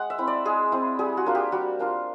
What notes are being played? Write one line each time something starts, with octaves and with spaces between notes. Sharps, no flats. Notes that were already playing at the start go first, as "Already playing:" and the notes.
Already playing: G#3 F#5
E5
C4 E4
D5
G#3 G#4
C4 E4
G3 G#4
F#4
A#3 D4 F4
G4
G3 F#4
A#3 D4 F4